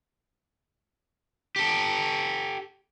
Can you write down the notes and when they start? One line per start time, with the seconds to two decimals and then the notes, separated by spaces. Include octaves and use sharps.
1.56 G4 A4